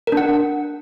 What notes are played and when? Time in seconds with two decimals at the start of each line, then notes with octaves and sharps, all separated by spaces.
0.07 A#4
0.12 D4
0.17 F#5